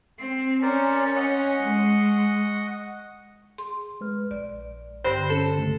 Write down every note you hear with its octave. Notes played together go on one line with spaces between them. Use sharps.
C4
C#4 A#4 C5 D5
D#5 F#5 C#6
G#3
G#4 C6
G#3 B4 F6
A#1 D5
G2 D3 C5
C#4 A4 A5
B1 C#3 A3